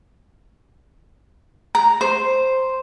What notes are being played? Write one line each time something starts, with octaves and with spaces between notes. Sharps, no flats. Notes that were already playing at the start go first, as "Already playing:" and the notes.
A#5
C5